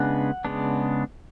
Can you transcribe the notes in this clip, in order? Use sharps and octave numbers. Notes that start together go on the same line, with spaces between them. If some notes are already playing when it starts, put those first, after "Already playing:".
Already playing: C#3 G#3 B3 D4 F#5
C#3 G#3 B3 D4